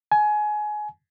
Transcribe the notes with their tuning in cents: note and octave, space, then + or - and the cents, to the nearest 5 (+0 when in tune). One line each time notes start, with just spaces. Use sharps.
G#5 +25